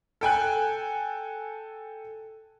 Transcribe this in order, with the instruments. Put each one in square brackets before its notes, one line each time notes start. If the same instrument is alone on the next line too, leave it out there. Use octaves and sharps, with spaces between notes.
[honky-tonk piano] A4 G5 G#5 F#6